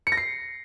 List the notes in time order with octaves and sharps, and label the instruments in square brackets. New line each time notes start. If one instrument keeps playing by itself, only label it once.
[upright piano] C#7
A#6
C7